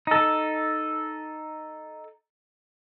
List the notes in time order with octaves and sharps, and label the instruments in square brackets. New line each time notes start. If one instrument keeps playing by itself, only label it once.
[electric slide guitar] D#4 A4